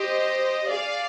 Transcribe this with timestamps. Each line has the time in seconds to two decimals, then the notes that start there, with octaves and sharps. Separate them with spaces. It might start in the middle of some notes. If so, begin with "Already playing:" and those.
Already playing: G4 C5 D#5
0.70 G#4 D5 F5